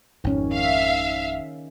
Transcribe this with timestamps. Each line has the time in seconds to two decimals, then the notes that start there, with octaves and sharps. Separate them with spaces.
0.24 G#1 F2 D#3 C#4
0.54 E5 F5